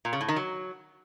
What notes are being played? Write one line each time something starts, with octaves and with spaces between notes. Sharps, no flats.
A#2
C#3
A2
D#3
F#3